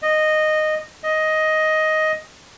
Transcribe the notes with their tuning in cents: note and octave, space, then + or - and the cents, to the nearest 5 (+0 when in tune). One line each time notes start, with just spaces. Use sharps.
D#5 -10
D#5 +10